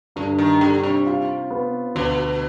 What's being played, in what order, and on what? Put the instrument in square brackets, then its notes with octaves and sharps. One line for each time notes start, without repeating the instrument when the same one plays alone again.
[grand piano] G2 [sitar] D3
[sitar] D#3
[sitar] D3 [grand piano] G3
[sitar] C3
[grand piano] F4
B3
[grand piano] D2 [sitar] B2